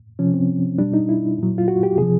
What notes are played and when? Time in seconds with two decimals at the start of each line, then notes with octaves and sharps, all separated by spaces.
0.19 C3 F3 C#4
0.34 C4
0.78 B2 G3 D4
0.94 D#4
1.09 E4
1.38 A#2 F#3
1.58 F4
1.68 F#4
1.83 G4
1.98 C3 F3 G#4